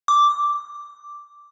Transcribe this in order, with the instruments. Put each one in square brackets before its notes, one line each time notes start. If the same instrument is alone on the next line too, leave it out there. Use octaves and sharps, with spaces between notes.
[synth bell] D6